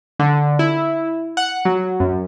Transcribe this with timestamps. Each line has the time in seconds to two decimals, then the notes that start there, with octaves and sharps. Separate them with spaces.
0.19 D3
0.59 E4
1.37 F#5
1.65 F#3
2.00 F#2